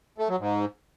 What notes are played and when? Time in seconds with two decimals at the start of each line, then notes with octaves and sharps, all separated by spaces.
0.18 A3
0.29 F#3
0.39 G#2